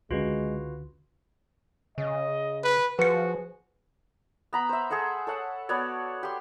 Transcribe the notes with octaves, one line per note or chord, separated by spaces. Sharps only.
C#2 D3 G#3 C#4 F4 F#4 B4
C#3 D#5
B4
F3 F#4 G#4 B4 C#7
B3 A#5 B5
C5 E5
G#4 A4 C5 F#5
A4 C#5 F#5
B3 F#4 C#5 D5
G4 C6